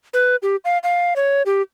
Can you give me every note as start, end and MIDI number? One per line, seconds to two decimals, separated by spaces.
0.14 0.36 71
0.43 0.56 67
0.65 0.78 77
0.84 1.14 77
1.16 1.42 73
1.46 1.62 67